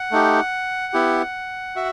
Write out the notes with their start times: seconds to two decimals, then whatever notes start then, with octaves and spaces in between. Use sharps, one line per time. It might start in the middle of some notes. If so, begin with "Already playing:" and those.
Already playing: F#5
0.11 A3 D#4 G4
0.93 B3 E4 G4
1.76 F#4 E5